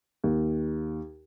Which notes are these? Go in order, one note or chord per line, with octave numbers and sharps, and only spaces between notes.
D#2